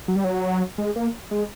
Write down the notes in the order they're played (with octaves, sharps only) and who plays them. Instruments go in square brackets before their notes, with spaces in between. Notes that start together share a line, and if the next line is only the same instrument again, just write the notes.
[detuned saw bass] F#3
G3
F#3
G#3
A#3
G#3